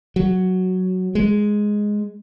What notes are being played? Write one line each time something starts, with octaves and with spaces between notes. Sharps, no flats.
F#3
G#3